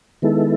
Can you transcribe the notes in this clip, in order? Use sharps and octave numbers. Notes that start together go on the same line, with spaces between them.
D#3 G#3 B3 E4 A4